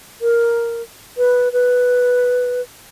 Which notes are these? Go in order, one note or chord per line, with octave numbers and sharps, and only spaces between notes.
A#4
B4
B4